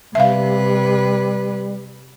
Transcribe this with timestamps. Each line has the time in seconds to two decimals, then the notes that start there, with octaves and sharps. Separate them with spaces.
0.15 C3 G3 B4 E5 F5